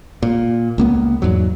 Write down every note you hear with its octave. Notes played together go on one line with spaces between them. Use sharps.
A#2
C#2 A#3 B3
E2 G#2 F#3